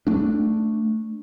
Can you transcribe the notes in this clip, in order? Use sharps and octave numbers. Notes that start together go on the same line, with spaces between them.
A3 D4